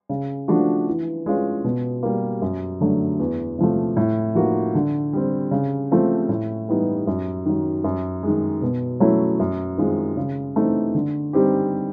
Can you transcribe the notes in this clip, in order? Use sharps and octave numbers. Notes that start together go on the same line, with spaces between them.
C#3
F3 A3 D4 F#4
E3
G#3 C#4 F4
B2
G3 A#3
F#2
D3 F#3 A3
E2
C3 F3 A3
A2
F3 A#3 D#4 F#4
D3
G3 C4
C#3
F3 A3 C4 F4
A2
E3 G3 B3 D#4
F#2
D#3 F#3
F#2
D#3 G#3
B2
F#3 A3 C#4 E4
F#2
D#3 G#3 C4 F4
C#3
E3 A3 C4 D#4
D3
G3 C4 D#4 G4